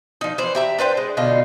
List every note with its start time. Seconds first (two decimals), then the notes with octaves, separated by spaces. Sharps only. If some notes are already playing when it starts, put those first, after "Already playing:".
0.21 F3 D#4
0.38 E3 C5 D5
0.55 G4 E5 A#5
0.79 D4 B4 C5 G5
0.97 G#3
1.17 B2 D3 D#4 F4